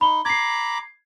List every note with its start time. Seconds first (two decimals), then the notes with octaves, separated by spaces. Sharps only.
0.01 D#4 B5 G7
0.25 A#5 B5 D6 G#6 C7